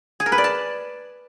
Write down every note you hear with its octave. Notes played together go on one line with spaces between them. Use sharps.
G#4
A#4
B4
D5
A5